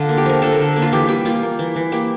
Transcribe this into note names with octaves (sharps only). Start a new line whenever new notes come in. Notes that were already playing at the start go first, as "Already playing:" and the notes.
Already playing: D3 F4
A#3
G4
F3 A#4
D3 A4
A#4
D3 A4
A#3
F4
E3 G4
G3 G4
A#3 F4
A#3
E3
E3
A#3 G4